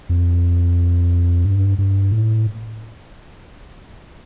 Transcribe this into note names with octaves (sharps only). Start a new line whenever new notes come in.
F2
G2
G2
A2